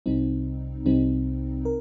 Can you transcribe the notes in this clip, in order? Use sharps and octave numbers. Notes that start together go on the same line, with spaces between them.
C2 C3 G3 C4 D#4
C2 C3 G3 C4 D#4
A#4